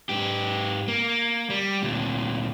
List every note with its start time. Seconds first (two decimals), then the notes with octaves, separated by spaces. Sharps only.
0.09 G#2 G4
0.88 A#3
1.50 G3
1.82 D2 A#2